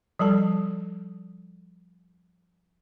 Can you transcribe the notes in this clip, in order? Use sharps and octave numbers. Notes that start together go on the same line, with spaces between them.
F3 G3 A4 A5